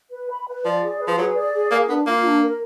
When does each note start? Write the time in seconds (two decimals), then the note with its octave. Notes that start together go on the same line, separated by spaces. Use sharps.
0.11 B4
0.30 B5
0.48 B4
0.65 F3 D5
0.82 G#4
1.00 B4
1.07 F3
1.18 F#3 G#4
1.35 D5
1.53 G#4
1.71 A#3 A#4
1.89 B3 D4
2.07 A#3 F4
2.25 D4
2.42 A#4